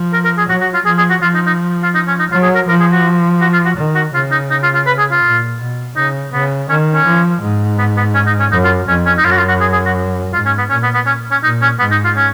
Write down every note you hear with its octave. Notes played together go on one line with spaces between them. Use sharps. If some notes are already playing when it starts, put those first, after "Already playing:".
Already playing: F3
A#4
A#4
G#4
F#3 F#4
F#4
F4
F3 G#4
G#4
F#4
F3 F4
D#4
D#4
F4
D#4
C#4
D#4
F#3 F4
G#4
A#4
F3 A#4
G#4
F#4
F#4
F4
F#4
D#3
F#4
C#3 F4
D#4
D#4
F4
F4
B4
G#4
F4
A#2
B2
C#3 D#4
C#3 B3
D#3 C#4
C#4
F3
G#2
B3
B3
C#4
D#4
C#4
F#2 D#4
F4
F2 C#4
C#4
D#4
F#2 F4
F#4
F4
F#4
G#4
G#4
F#4
G#2 F4
C#4
B3
A#2 C#4
B3
B3
C#4
C#4
A#2 D#4
C#4
G#2 B3
D#4
F4
C#4